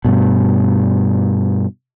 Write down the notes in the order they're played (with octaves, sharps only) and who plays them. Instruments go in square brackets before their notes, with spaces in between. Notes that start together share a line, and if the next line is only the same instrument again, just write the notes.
[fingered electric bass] G2 B2